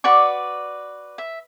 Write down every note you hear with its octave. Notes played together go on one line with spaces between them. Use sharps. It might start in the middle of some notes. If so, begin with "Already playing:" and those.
F#4 B4 D5 C#6
E5